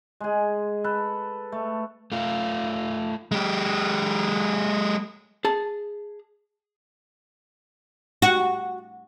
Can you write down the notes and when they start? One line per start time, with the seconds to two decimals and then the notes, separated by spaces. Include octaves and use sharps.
0.20 G#3 G#4
0.84 A4 B4
1.52 A3
2.12 A3 F4
3.32 G#3 G4
5.45 G#4 A5
8.22 F#4